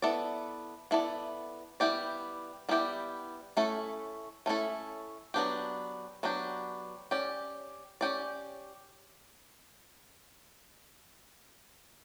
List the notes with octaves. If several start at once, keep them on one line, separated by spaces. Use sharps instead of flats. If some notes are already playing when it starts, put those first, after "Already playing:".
B3 E4 A4 D5
B3 E4 A4 D5
G3 B3 E4 G4 D5
G3 B3 E4 G4 D5
A3 C#4 E4 A4
A3 C#4 E4 A4
F#3 B3 D4 G4
F#3 B3 D4 G4
C#4 G4 D5
C#4 G4 D5